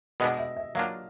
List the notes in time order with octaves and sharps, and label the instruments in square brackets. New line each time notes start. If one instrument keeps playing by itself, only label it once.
[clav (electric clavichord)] B2 G#3 B3 D4 [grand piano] D#5
[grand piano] E5
E5
[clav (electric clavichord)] F#3 A#3 D4 F4 [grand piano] F5